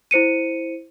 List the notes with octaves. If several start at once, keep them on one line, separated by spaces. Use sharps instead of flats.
E4 C5 C#7 D#7